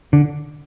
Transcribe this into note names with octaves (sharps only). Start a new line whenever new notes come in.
D3